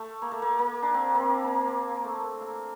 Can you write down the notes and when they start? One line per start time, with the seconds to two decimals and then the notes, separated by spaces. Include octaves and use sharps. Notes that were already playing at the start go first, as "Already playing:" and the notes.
Already playing: A3
0.22 A#3
0.32 A3
0.42 A#3
0.59 A#3
0.82 D4
0.94 C4
1.15 A#3 C4
1.44 A#3
1.68 A#3
2.04 A3
2.41 A#3